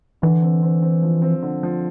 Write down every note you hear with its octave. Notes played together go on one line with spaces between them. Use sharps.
D3 E3
C4
C4
C4
F3
C4
D3
F3